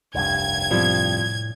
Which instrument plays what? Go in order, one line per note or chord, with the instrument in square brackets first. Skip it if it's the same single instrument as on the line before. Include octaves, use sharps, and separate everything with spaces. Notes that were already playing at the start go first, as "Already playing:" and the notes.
[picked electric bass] F1 C2 G2 [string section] G#6
[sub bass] A2 [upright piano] F3 G3 C4